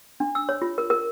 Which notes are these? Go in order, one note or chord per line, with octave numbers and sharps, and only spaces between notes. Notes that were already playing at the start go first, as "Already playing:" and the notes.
D4
E6
C#5
F4
A#4
A#4